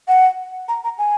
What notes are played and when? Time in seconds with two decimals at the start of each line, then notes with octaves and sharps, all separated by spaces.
0.08 F#5
0.68 A#5
0.84 A#5
0.98 G#5